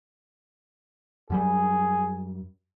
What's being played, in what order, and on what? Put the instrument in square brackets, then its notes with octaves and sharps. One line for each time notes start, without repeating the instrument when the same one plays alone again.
[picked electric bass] F#2 F#3 G3 [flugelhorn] G#4